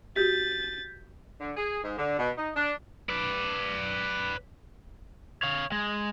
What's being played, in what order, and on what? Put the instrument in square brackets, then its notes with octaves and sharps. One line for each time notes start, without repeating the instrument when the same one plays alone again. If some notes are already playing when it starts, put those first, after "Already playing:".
[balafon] F#4 G4 [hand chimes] G6 B6 [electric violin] A6
[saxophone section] D3
G#4
G#2
D3
B2
D#4
D4
[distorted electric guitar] B4 D5
[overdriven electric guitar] C#5 F5
G#3